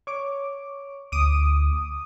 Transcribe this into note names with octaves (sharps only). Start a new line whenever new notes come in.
C#5 D6
D2 D6 D#6